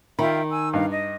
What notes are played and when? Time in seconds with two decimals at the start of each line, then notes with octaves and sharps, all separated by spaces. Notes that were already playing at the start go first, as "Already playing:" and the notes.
0.19 D#3 F4 E5 G5 B5
0.49 G#5 E6
0.73 G2 D#4 F5
0.93 D#5